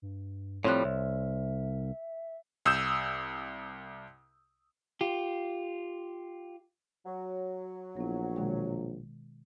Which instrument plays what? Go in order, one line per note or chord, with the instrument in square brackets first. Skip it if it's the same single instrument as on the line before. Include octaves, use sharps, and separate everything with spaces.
[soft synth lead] G2
[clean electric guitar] A2 F3 G3 [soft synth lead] C4 [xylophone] C#5 C6 F#6
[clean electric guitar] C2 [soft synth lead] E5
[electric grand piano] C2 D#6 E6 G6 E7
[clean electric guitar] F4 G4
[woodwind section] F#3
[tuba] A#1 [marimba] B3 E4
[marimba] B2 D#3 G#3